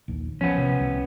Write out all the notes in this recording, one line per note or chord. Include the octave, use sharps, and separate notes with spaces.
A#1 D#2
F3 B3 C#4
C3
C2 C3